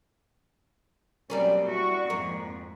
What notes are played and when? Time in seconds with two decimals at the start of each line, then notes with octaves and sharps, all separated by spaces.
1.30 B2 F#3 G3 A#3 C4 C#4
1.64 E4 F#4 C#6
2.10 F2 G#2 A#3